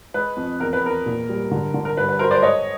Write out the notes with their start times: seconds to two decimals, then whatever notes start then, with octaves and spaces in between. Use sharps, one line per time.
0.14 G#3 B4
0.37 F2
0.60 E2 A#4
0.73 B4
0.83 E2 A#4
1.06 A#2
1.29 G3
1.51 D3
1.74 D3
1.85 A#4
1.97 G2 B4
2.09 B4
2.19 F#3 A#4 C5
2.31 C5 D5
2.42 G#3 C#5 D#5